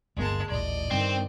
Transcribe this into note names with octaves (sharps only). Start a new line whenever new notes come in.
D1 G1 G#3 A#3 A5
D#1 A1 D5 D#5
G2 D#3 C4